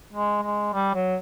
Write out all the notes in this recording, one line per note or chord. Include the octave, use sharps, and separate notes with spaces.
G#3
G#3
G3
F#3